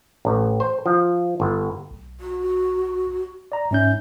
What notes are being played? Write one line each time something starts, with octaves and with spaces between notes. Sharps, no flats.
A1
C5
F3
G1
B1
F#4
D5 A#5
G#2 C#4 E5 G6